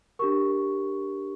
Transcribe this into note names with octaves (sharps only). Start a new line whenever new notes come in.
D4 G4 A#4 C#6